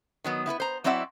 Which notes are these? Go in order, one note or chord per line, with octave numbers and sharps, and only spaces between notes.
D#3 F#3 B3
B3 E4 G4 B4
C5 A#5
F#3 C4 E4 D5 E5 F#5